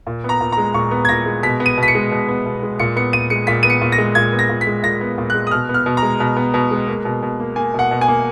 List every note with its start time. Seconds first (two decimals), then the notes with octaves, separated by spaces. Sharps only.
0.07 A#2
0.24 B3 A#5
0.41 A#2
0.52 A#5
0.58 G#3
0.74 A#2 C#6
0.91 B3
1.05 G#6
1.09 A#2 A#6
1.26 G#3
1.43 B2 B6
1.60 B3
1.66 D#7
1.77 B2
1.83 B6
1.88 C#7
1.95 G#3
2.11 B2
2.28 B3
2.45 B2
2.63 G#3
2.80 A#2 C#7
2.96 B3 C#7
3.13 A#2 D#7
3.30 G#3 C#7
3.47 A#2 B6
3.63 B3 D#7
3.70 C#7
3.81 A#2
3.92 A#6
3.98 G#3
4.15 A#2 G#6
4.32 B3
4.39 A#6
4.49 A#2
4.61 B6
4.67 G#3
4.83 A#2 A#6
5.01 B3
5.18 A#2
5.30 G#3 F#6
5.47 D#6
5.51 B2 F6
5.69 B3
5.74 F6
5.86 B2
5.97 A#5
6.02 G#3
6.20 B2
6.37 B3
6.54 B2
6.71 G#3
6.88 A#3
7.05 B2
7.23 B2
7.40 A#3
7.56 A#3 G#5
7.74 B2 F#5
7.91 B2
8.01 G#5
8.08 A#3